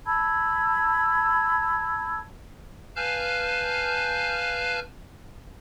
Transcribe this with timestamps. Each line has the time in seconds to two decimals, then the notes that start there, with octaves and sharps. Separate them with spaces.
0.06 A5 B5 E6 G#6
2.96 B4 F5 G#5 A5 F6 G6